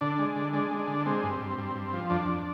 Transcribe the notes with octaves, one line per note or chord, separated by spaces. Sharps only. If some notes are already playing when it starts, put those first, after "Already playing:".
D3 D4
G#3
D3
G#3 D4
G#3
D4
D3
G#3 C4
G2
G2
G2
G2
F3
F2 D4
F2